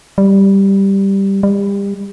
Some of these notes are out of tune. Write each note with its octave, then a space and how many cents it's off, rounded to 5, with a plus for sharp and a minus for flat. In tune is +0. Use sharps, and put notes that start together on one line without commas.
G3 +0
G3 +30